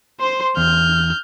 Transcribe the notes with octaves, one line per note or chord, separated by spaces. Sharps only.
C5 C6
E2 F6 G6